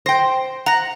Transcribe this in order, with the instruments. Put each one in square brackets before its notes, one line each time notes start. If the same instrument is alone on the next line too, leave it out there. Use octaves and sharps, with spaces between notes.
[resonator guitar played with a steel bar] C5 G5 [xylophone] A#6
[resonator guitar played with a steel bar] F#5 [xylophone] A#5 A#6